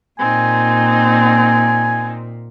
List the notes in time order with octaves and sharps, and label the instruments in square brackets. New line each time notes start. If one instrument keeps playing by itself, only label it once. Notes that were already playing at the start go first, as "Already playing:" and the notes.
[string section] A#2 [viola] C4 D#4 [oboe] G#5